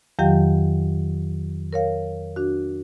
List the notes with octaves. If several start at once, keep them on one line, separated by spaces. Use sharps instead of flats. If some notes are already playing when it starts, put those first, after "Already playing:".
F2 D#3 F#3 G4 F5 G5
A#4 C#5 F5
D4 F#4